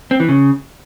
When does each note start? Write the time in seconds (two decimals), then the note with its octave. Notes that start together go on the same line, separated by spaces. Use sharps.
0.11 C4
0.20 E3
0.29 C#3